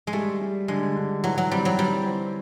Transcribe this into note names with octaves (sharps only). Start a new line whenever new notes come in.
G#3
G3 A3
G3
D3 G#3
D3
E3 F#3
F#3
G3 C4
F#3
E3 G3
C4